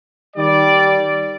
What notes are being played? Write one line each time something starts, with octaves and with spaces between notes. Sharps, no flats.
D#3 G3 D5